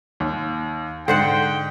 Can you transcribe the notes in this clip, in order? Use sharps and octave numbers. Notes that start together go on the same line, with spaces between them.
D#2
G#2 D3 C5 F#5 G5